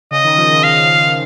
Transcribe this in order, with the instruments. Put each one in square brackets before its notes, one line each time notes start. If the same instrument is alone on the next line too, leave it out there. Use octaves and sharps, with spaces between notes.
[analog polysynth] C#3 [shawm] D#5
[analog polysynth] D#3
F3
D#3
[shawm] F5